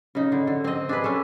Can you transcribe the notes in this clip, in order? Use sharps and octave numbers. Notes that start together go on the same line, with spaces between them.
C#3 D#4
D3
D3
C4 D#5
D4 G#4 B4
C#4 A4